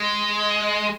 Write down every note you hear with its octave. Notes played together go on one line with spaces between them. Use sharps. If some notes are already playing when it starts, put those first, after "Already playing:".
Already playing: G#3